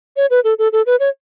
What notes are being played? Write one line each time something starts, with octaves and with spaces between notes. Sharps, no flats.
C#5
B4
A4
A4
A4
B4
C#5